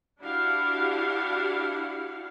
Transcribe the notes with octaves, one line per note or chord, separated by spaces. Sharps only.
D4 E4 F#4 G4 F5 F#5